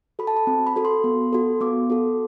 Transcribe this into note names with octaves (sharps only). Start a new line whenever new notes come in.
F#4 A4 B5
A5
B5
C4
B5
F#4 A4
C6
B3
F#4 A4
B3 D6
F#4 A4